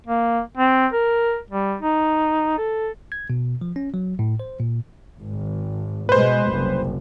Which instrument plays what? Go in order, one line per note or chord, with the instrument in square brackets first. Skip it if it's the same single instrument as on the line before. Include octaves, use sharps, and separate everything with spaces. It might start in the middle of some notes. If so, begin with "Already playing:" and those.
[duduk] A#3
C4
A#4
G3
D#4
A4
[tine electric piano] G#6
B2
F3
C#4
F#3
A2
C5
A#2
[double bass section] G#1
[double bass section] B2 G#3 [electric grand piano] B4 C5
[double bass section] F#1 C2